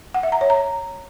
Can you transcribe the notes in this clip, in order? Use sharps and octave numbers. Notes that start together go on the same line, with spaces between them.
F#5
E5
A#5
C#5
A#5